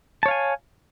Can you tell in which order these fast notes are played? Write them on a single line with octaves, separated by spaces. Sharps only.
A5 C#5 F5 G#5